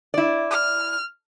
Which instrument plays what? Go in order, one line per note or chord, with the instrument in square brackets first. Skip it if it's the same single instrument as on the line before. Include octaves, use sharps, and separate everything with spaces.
[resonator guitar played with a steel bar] E4 D5
[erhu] F6